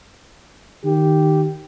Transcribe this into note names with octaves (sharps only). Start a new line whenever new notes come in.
D#3 G4